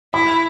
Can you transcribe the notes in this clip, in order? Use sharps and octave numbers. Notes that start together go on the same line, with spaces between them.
E4 B5